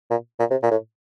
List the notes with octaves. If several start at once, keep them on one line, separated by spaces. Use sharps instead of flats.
A#2
A#2
C3
A#2
A2